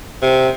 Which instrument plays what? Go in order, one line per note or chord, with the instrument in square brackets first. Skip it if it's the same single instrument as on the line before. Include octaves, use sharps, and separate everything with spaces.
[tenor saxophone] C3